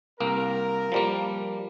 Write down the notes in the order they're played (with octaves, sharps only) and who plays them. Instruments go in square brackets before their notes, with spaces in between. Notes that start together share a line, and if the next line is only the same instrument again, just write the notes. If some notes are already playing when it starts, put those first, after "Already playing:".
[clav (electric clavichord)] C2 A#3 [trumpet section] A#4
[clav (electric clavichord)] F3 G3 A#3